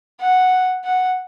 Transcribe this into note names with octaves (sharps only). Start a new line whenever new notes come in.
F#5
F#5